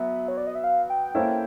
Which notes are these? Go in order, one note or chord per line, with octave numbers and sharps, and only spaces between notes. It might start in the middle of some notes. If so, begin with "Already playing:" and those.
Already playing: F#3 B3 E5
C#5
D5
D#5
E5
F5
G5
A#3 C#4 E4 A4 C5